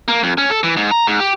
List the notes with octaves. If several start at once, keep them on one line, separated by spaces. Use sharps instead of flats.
A#3
F2
C#4
A4
E3
G#2
A#5
G#2
G4